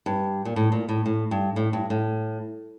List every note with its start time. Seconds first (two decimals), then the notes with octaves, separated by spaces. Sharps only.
0.06 G2
0.45 A#2
0.56 A2
0.72 A#2
0.89 A2
1.06 A2
1.31 G2
1.56 A2
1.73 G2
1.90 A2